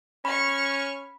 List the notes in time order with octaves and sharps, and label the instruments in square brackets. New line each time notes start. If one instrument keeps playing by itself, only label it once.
[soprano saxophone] C#4 [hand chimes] B5 [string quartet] C#6 F6